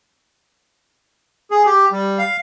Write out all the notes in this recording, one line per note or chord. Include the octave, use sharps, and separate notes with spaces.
G#4
G4
G3
F5